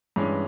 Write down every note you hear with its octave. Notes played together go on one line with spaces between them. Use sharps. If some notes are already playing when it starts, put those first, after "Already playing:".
G2 E3 G#3 C#4